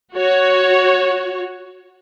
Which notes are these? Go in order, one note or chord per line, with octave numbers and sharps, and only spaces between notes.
F#4 C#5